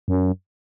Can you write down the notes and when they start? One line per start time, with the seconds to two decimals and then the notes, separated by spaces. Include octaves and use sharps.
0.08 F#2